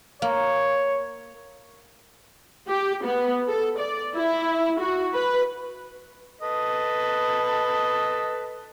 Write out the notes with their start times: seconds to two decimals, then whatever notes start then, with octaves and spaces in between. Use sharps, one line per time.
0.22 A#3 C#5
2.69 G4
3.04 B3
3.48 A4
3.79 D5
4.14 E4
4.80 F#4
5.14 B4
6.41 A4 B4 D#5